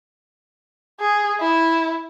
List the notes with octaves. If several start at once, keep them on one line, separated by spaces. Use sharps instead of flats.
G#4
E4